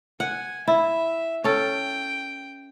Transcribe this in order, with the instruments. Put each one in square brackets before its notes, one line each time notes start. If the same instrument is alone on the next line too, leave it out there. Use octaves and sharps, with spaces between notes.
[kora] F#5 [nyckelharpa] G#5
[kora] E4 [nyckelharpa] E5
[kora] C#4 A4 [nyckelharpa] G5